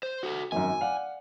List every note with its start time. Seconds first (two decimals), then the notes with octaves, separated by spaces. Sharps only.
0.03 C5
0.23 F#4 A4
0.52 G#1 F#2 G#5
0.80 D5 F5 F#5